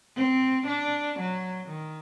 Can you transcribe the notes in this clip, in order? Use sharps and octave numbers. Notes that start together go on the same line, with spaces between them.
C4
D4
F#3
D#3